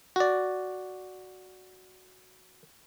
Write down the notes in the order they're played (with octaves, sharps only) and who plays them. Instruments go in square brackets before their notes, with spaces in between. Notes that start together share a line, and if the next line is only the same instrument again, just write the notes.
[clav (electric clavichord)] F#4 D5